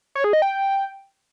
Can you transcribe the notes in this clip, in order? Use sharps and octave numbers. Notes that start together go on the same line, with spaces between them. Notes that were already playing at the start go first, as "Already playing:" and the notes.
C#5
G#4
D#5
G5